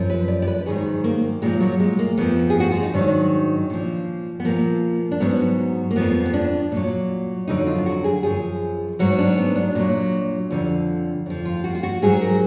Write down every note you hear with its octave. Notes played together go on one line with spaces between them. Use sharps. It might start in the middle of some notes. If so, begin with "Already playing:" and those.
Already playing: F#2 F3
B4
D5
D5
B4
G#2 D#3 F#3 G#4
A#3
A#2 F3 G#3
F#3
G#3
A#3
F2 F3 B3
G#4
F#4
F4
D#4
G#2 D#3 F#3 D4
A#2 F3
B3
A#2 F3 A#3
D4
G#2 D#3 F#3 B3
A#3
F2 F3 B3
B3
D4
A#2 F#3
F2 D3 F#3 D#4
F4
F4
F#4
G#4
F#2 F3 G#4
G#2 F#3 F#4
D4
B3
D4
A#2 F#3
F2 D3 F3
F2 F3
F4
F#4
F4
F#4
G#2 F#3 G#4
A#4